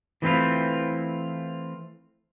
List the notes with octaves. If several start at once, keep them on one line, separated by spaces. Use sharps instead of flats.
E3 A3 C4 E4 F4